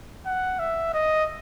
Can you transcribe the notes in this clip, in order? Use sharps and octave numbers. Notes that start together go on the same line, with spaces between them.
F#5
E5
D#5